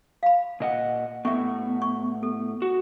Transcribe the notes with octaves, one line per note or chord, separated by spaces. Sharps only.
F5 B5
A#2 D#5 F#5
A2 A3 B3 E5 C#6
C#6
A4
F#4